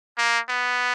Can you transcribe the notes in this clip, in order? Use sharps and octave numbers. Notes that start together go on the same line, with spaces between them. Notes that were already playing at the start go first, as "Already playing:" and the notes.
A#3
B3